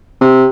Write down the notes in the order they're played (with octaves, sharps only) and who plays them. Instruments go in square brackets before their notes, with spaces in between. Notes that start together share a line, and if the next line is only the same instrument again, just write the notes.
[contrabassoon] C3